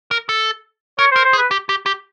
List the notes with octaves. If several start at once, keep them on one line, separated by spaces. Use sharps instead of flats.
A#4
A4
A#4 C#5
A#4 C5
C5
G#4
B4
G4
G4
G4